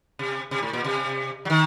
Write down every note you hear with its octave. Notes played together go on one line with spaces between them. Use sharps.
C3
C3
A2
A#2
C3
F#3
D#3